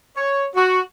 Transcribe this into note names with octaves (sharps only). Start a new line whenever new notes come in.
C#5
F#4